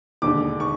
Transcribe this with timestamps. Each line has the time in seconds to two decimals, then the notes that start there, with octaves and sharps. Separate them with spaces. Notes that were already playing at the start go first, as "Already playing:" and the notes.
0.22 E1 D#2 D3 D6
0.60 C#6